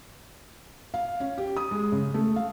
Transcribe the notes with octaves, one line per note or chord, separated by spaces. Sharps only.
F5
C#4
G4
D#6
G#3
C#3
A3
F5